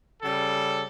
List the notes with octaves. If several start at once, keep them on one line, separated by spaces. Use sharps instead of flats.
C#3 G3 A4